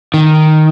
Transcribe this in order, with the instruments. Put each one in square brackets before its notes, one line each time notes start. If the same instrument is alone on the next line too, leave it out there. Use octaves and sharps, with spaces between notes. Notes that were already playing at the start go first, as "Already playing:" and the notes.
[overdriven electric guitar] D#3